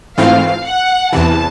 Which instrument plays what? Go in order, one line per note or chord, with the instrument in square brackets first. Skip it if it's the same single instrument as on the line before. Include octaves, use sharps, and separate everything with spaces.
[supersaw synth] G#2 E3 A3 C4 F4 [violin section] F5
[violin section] F#5
[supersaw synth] E2 C3 E3 [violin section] A5